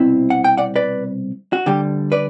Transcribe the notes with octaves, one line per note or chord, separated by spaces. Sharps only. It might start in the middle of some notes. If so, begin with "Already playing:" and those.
Already playing: C2 B2 C4 E4
F#5
G5
D5 F#5
B4 D5
F#4
D2 D3 G3 G4
B4 D5